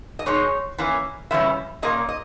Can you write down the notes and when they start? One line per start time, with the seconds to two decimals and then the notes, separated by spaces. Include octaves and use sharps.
0.19 D#5
0.26 B2 G#3 D#4 C#5
0.78 E3 A#3 C#4
1.31 C#3 E3 G3 C#4 E5
1.82 A#2 A#3 C#4 D#5
2.09 D#5